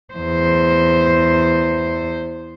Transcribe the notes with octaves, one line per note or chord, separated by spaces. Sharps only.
E2 C5